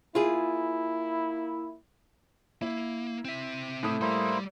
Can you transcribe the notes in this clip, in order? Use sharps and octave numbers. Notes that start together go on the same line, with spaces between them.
A#3 E4 F4 G#4
A#3 E4
C4 E5
A2 A3 D#6
G3 A#3 E4 C5